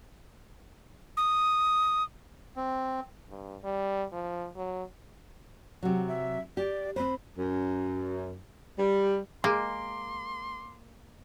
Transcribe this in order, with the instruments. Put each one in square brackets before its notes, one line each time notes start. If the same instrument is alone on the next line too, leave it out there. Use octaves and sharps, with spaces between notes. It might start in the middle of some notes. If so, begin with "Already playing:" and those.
[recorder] D#6
[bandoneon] C4
[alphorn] G2
G3
F3
F#3
[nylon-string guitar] C3 F#3 [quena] F#5
[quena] E5
[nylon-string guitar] G4 [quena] D5
[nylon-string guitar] C4 C5 [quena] B5
[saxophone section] F#2
G3
[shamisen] G#3 [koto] A#3 [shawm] C6 [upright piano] D6